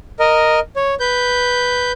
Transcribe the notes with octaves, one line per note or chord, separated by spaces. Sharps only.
A#4 D#5
C#5
B4 G6